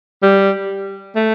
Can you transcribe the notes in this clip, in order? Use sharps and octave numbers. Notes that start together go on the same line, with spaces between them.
G3
A3